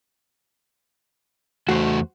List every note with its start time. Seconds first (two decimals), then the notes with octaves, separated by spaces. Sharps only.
1.69 E2 A3 F#4 C5